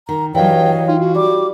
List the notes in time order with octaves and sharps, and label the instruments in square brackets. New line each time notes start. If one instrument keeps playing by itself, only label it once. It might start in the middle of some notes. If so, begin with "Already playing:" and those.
[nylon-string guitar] D#3 [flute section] A#5
[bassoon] G2 [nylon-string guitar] E3 F#3 [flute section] C#5 D#5 F5 [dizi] G5
[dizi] D#4 [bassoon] F4
[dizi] F#4
[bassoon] G3 [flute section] D6